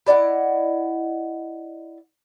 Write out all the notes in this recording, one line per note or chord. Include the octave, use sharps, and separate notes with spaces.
E4 D5 D#5 F#5